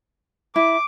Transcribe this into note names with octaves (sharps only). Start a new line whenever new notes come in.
E4 D6